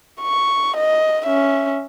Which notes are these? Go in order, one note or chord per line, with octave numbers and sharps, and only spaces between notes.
C#6
D#5
C#4 E5